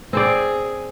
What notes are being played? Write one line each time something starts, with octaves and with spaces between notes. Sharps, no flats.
C4 G#4 C5 D5